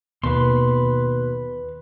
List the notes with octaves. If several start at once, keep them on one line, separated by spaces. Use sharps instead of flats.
D#2 B2 D#3 A#3 B4 C6